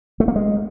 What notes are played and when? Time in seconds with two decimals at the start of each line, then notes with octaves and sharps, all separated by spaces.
0.20 A3
0.28 A#3
0.36 G#3